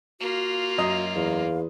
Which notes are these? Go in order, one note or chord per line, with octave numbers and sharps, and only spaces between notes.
A#3 F4 F#4
F#2 D#5 D#6
E2 F5